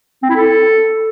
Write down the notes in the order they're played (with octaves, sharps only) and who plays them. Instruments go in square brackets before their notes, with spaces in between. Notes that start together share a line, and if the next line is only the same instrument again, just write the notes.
[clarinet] C4
E4
A4